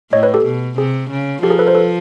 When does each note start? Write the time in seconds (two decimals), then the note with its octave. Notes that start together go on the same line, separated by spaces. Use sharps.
0.12 A2 C#5 D#5
0.23 B4 C#5
0.34 G4 A4
0.45 B2
0.77 C3 G#4
1.10 C#3
1.43 F3 G4 A4
1.50 G#4 A#4
1.59 A4 B4
1.67 A#4 C5
1.75 A4 B4